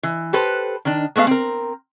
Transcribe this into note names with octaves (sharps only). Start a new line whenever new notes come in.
E3
G4 A4 B4 C5
D#3 D4
G#3 A3 B3 D#5 F5
C4 A#4